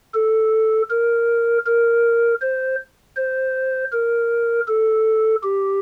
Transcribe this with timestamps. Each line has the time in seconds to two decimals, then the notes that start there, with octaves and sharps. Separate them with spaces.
0.14 A4
0.90 A#4
1.66 A#4
2.42 C5
3.17 C5
3.92 A#4
4.68 A4
5.43 G4